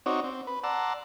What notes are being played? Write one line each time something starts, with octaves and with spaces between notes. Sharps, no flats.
C4 D#4 F#4 C#5 D5
C4
B4
D5 F#5 A5 A#5 C6 E6